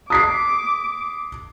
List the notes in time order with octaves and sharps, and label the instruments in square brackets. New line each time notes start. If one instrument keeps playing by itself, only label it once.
[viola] D6 [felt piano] D#6 B6 C7